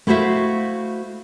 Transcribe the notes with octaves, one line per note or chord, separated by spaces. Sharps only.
A3 E4 F#4 C5 E5 F5